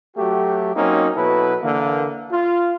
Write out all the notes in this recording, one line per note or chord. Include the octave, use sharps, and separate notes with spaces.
F#3 A3 F#4 G4
F#3 A#3 C4 C#4 D#4
B2 F#3 E4 A4 B4
D3 E3 A#3
F4